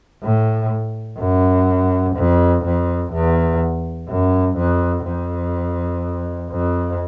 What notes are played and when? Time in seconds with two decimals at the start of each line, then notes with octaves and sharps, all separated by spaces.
0.23 A2
1.18 F#2
2.16 F2
2.65 F2
3.13 E2
4.09 F#2
4.57 F2
5.05 F2
6.50 F2